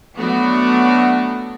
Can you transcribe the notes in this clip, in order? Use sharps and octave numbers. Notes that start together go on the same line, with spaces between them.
F#3 A3 B3 D4 F#4